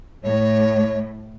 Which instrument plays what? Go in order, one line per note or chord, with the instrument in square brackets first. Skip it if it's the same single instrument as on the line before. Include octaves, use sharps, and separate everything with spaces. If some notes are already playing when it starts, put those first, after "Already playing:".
[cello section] A2 [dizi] C#5